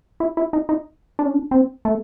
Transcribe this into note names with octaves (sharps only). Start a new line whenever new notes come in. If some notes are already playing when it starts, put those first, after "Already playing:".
E4
E4
D#4
D#4
D4
C#4
D4
C4
A3